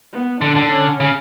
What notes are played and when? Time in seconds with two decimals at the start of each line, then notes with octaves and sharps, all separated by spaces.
0.13 B3
0.41 D3 D4
0.56 D3
0.71 C#4
1.00 C#3